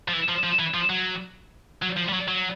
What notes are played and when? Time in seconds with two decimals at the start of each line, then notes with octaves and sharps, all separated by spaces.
0.08 F3
0.13 E3
0.28 F3
0.43 F3
0.59 E3
0.74 F3
0.90 F#3
1.82 F#3
1.97 F3
2.08 G3
2.13 F#3
2.28 F#3